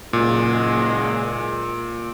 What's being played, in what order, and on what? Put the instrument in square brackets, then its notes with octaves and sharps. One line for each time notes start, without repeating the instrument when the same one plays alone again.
[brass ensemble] F#1 F#3 G#3 [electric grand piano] A#2